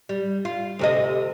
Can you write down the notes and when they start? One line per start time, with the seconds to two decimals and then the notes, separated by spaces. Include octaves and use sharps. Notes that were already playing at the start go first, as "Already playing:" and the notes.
0.09 G3
0.45 F4
0.79 D2 C3 D#5